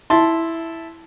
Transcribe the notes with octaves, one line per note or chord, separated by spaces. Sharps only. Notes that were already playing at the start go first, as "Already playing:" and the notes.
E4 A5 C6